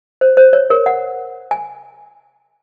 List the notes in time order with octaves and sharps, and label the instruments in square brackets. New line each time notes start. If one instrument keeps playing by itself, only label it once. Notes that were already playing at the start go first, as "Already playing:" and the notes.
[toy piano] C5
C5
C#5
A#4
F#5
G#5